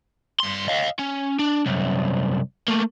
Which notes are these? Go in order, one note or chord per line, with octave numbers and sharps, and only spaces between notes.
G2 C6
D#5 F5
C#4
D4
C2 F#2
A3 A#3